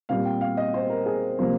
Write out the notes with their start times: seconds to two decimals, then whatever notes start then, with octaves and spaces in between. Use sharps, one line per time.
0.09 A#2 G3 C4 F5
0.25 G5
0.41 F5
0.57 D#5
0.74 C5
0.90 A#4
1.06 G#4
1.38 C3 F3 A#3 C5